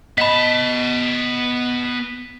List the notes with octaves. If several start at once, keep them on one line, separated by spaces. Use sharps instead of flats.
B3 D#5 A5 B5 B6